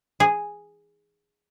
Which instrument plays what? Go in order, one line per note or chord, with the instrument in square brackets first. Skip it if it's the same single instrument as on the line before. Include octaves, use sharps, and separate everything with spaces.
[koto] G#4